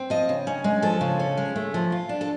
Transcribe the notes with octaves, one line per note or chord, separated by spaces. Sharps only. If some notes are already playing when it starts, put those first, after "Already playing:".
Already playing: C4
F3 D#5
C#3
C#4
G#3
F3 A4
C#3
C#4
G#3
A3
F3
F4
D4
A4